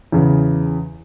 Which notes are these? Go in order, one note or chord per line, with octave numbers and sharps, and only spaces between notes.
E2 C#3